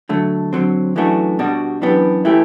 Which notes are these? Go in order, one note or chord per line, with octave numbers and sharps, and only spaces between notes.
D3 F#3 A3
D3 F#3 C4
F#2 E3 A3 D4 F#4
B2 G3 D4 F#4
F#2 E3 B3 D4 G4
E3 A3 E4 G4